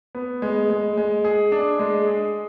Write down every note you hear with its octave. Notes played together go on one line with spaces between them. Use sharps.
B3
G#3
G#3
G#3
G#4
D4
G#3
G#4